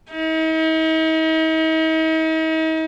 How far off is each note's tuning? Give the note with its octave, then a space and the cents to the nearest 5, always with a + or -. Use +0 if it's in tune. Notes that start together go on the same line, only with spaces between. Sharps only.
D#4 +45